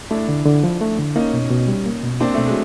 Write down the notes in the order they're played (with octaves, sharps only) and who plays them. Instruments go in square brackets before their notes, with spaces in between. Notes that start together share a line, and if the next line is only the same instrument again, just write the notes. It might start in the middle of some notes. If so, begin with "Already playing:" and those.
[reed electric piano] A3 [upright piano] D4 E4
[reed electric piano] D3
D3
F3
A3
D3
[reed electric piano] A#3 [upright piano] C#4 D#4
[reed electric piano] B2
B2
G3
A#3
B2
[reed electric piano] A#3 [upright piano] C4 D4
[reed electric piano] B2 [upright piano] A3
[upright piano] F#3 G#3